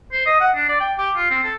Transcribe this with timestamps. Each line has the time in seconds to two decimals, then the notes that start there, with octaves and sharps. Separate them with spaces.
0.12 C5
0.26 D#5
0.40 F#5
0.55 D4
0.68 D5
0.80 G5
0.98 G4
1.16 F4
1.30 C4
1.44 A4